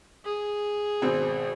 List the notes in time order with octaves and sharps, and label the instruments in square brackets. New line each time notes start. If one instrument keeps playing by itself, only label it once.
[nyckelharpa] G#4
[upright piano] G#1 B2 C4